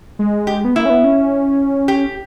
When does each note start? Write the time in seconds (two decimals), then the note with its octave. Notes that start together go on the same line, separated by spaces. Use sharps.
0.19 G#3
0.47 G4
0.65 B3
0.75 A#3 E4
0.86 C#4
0.90 B3
1.04 C#4
1.88 G4